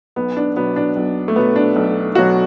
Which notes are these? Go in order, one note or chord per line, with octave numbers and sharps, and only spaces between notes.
B1 B3
D4
B2 F#3 B3
D4
B1
A3
B2 F#3 B3
D4
B1
B2 F#3 F#4